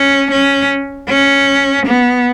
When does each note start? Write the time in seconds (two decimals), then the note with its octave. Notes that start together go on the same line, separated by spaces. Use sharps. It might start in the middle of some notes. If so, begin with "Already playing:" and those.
Already playing: C#4
0.31 C#4
1.09 C#4
1.86 B3